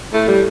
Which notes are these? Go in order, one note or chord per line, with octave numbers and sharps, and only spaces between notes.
A2 A3
G3